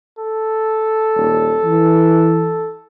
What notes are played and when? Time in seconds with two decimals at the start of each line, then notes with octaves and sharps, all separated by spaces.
0.19 A4
1.16 D#1
1.65 E3